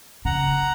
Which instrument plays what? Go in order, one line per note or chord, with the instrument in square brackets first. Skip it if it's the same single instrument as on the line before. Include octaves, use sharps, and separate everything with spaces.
[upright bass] C#3 [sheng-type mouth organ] F#5 A#5